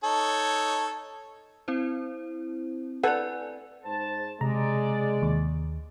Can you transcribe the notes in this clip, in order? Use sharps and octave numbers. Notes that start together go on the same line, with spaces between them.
D#4 A4 C#5
C4 E4 C5
A4 B4 D5 F#5 G#5
G#2 C5 A5
C3 G#3 D5 A#5
D#2